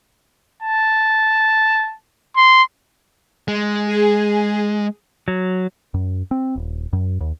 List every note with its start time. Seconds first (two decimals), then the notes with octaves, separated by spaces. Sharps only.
0.62 A5
2.36 C6
3.48 G#3
3.87 G#4
5.28 F#3
5.94 F#2
6.31 C4
6.56 D#1
6.93 F#2
7.21 D#2